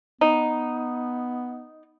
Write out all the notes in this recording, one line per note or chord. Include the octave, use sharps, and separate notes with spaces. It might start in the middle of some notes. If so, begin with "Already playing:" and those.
B3 D#4